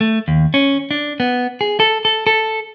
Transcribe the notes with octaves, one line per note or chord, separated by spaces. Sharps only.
A3
D#2
C#4
D4
B3
G#4
A4
A4
A4